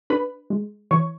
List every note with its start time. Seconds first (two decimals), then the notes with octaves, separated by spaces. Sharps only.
0.10 D4 B4 B5
0.50 G#3
0.91 E3 C#5 C#6